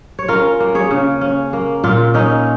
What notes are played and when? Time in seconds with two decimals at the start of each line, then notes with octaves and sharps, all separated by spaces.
0.19 C#5
0.28 C#4 F4 A#4
0.60 A#3
0.75 G#4 C#5
0.91 C#3
1.21 C#4
1.53 A#3
1.84 A#2 F4
2.14 C#4 D#4